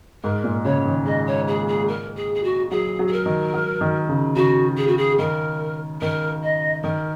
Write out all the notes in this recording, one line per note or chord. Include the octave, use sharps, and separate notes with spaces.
G#2 A#4
A#2
C#3 C#5
D#3
G#3 D#5
C#5
G#4
G#4
A#4
G#4
G#4
F#4
F#3 G#4
F#3
G#4
A#4
D#3
F#3
D#3
C#3
C#3 F#4
G#4
F#4
G#4
D#3 A#4
D#3 A#4
D#5
D#3 A#4